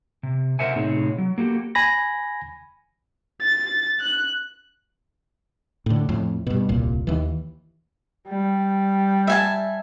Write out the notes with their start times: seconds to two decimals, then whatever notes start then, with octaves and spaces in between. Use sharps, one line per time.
0.23 C3
0.59 A#4 C5 E5 F#5 G#5
0.76 A2 C3 C4 D#4 G#4 C#5
1.18 F#3
1.38 A#3 F#4 G4 A4
1.75 G#5 B5 A#6
3.41 A6
4.01 F#6
5.86 A2 D3
6.09 F2 A2
6.47 G2 B2
6.69 D#1 C2 A#2
7.07 D#2 E3
8.29 G3
9.27 E5 G#5 A5